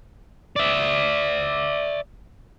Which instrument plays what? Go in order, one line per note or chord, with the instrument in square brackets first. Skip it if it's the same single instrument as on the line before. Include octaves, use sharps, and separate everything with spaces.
[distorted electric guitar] D5 E5